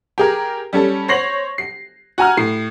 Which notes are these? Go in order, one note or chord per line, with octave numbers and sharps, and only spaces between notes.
G4 G#4 A#4
G3 C#4 A4
C5 C#5 A#6 C7 F#7
C7
F#4 G#5 A#5 F6
A2 C7